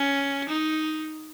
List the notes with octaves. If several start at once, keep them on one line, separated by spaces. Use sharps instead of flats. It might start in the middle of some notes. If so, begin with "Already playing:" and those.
Already playing: C#4
D#4